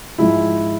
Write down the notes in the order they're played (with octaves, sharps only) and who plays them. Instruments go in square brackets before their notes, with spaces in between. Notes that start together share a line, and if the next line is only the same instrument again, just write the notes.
[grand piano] G#2 F3 G#3 E4